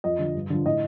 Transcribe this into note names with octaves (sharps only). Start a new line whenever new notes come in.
F2 D#5
D3 F3
G2
D3 F3
A2 D#5